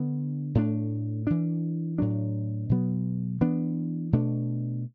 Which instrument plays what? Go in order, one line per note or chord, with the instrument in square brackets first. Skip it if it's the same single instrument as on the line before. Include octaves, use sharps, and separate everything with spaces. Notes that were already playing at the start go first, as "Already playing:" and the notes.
Already playing: [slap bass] D3 B3 D4
A2 A3 D4
E3 D4
A2 F#3 D4
B2 F#3 B3
E3 B3 D4
B2 A3 D4